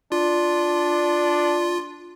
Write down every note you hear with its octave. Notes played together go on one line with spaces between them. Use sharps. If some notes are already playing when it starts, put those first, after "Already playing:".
D4 F4